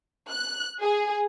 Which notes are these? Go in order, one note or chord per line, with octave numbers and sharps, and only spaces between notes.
F#6
G#4